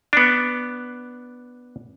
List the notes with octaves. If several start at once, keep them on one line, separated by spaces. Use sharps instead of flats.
B3 D4